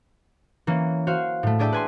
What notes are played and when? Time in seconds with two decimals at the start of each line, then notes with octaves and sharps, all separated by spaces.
0.67 E3 A#3 C#4
1.07 F#4 C5 F5
1.43 A2 A3
1.59 D4 G#4 D5 E5 G5 A5
1.73 B4 G#5 C6